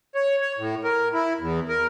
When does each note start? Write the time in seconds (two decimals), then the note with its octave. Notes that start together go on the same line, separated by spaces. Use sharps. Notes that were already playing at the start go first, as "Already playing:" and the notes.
0.15 C#5
0.41 C#5
0.58 A2
0.84 A#4
1.13 E4
1.40 E2
1.69 A#4